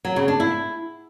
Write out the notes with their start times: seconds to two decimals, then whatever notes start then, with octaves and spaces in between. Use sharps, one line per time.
0.05 F#3
0.16 C#3
0.28 D4
0.40 E4